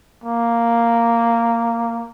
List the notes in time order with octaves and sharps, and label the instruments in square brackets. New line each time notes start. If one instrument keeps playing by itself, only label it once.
[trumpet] A#3